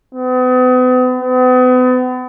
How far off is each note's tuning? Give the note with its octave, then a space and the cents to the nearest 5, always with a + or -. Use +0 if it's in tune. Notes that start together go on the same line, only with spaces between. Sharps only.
B3 +40
B3 +40